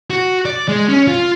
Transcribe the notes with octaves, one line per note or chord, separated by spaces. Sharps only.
F#4
D5
G#3
C#4
F4